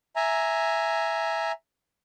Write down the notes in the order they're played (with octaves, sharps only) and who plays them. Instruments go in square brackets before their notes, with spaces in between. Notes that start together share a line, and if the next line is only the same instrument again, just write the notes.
[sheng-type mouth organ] E5 G#5 A#5